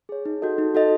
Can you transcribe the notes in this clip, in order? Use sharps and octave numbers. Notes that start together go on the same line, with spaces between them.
G#4 C#5
D#4
F#4 A4 D#5
D#4
F#4 A4 D#5